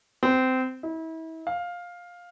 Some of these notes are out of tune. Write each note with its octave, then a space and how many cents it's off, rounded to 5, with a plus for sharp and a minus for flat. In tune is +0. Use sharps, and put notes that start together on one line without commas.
C4 -20
E4 -35
F5 +10